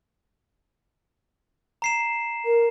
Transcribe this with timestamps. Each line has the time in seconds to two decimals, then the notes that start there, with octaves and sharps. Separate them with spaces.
1.82 A#5 C7 E7
2.45 A#4